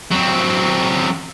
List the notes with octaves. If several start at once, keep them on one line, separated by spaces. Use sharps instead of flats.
F#3 C4